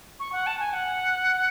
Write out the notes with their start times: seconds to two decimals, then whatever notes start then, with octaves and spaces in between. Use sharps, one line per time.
0.19 C#6
0.32 F#5
0.46 A5
0.59 G#5
0.73 F#5